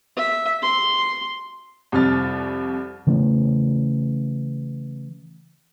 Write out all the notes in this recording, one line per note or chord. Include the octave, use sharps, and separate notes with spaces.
E5
C6
C2 F2 F6 A6
C#3 E3 A3 C#4